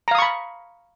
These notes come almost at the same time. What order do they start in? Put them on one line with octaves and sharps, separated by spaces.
A#5 F5 D#6 C#6 B5